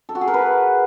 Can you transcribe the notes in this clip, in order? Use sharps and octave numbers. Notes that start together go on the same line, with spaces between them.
A4
F#4
G#4
A#4
B4